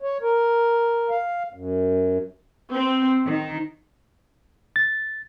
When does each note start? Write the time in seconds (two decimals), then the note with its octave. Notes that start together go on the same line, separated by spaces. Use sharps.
0.02 C#5
0.22 A#4
1.10 F5
1.54 F#2
2.72 C4
3.25 D#3
4.76 A6